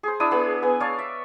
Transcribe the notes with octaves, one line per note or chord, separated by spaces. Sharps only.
G#4 C5
D4 E4 D#6 E6
B3 G#4
B3 G#5
C#5 D5 F5 A5
E5